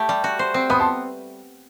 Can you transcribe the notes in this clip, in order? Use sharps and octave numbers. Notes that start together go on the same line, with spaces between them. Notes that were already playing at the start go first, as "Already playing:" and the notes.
Already playing: A3 G4
G3
F#4
C5
C4
B3 B5 D#6
A5 C6